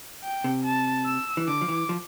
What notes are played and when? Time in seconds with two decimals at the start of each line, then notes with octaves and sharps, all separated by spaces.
0.24 G5
0.44 C3
0.64 A5
1.06 E6
1.37 E3
1.48 D3 D6
1.61 F3
1.68 E3
1.89 F3